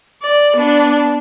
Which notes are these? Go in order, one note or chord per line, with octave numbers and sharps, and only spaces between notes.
D5
B3 D4